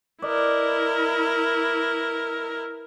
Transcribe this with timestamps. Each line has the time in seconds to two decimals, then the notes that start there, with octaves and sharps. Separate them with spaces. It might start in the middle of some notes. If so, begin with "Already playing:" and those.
0.22 E4 A#4 B4 D5 D#5